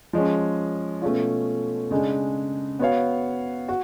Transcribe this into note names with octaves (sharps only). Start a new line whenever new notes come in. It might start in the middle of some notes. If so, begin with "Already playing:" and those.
F3 G#3 C#4
B2 A3 C#4 F4
C#3 G#3 D4
B3 F#4 C#5 F5
F#4